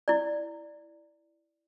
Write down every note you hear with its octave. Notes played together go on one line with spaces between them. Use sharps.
E4 D5